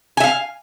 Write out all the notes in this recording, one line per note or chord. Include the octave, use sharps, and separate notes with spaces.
E5 F5 G#5